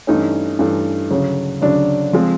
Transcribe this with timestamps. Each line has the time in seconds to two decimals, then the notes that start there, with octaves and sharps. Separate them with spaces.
0.07 G2 E3 A3 C#4 D#4
0.59 G2 E3 A3 C#4
1.10 D2 C#3 F#3
1.62 D2 C#3 F#3 D4
2.13 F3 G#3 C4